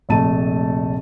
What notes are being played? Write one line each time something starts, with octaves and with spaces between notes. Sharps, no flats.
F1 A#1 A3 A5 D#7